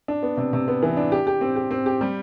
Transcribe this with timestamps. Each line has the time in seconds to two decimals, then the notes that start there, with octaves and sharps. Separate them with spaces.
0.08 D4
0.23 B3
0.37 C3
0.53 C3
0.68 B3
0.83 E3
0.97 D4
1.12 G4
1.27 G4
1.41 C4
1.56 G4
1.71 C4
1.86 G4
2.01 G3